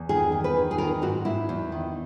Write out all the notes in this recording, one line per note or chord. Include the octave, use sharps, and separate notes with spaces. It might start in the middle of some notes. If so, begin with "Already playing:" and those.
Already playing: E2
D#3 G#4
E2
B4
D#3
G#4
D#3 A#4
G#2 F#4
G#2 E4
E2
D#3